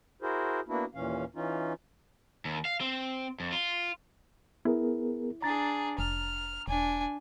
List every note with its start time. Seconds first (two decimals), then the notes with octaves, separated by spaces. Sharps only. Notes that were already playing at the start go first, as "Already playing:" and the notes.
0.22 E4 F#4 G#4 A#4 C5
0.69 A#3 B3 D4 E4 F#4
0.95 D#2 A#2 E3 C#4 F5
1.35 E3 C#4 D#4 F4
2.45 D#2
2.65 F5
2.81 C4
3.40 F2
3.52 F4
4.65 B3 E4 G#4 A#4
5.42 D4 G#4 A#5 A6
5.99 F1 F6
6.68 E1 D4 G#5